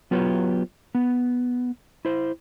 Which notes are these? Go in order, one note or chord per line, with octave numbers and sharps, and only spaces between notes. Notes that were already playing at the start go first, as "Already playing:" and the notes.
F#3 B3 F4 G4 B4 C#5
B3
E4 C5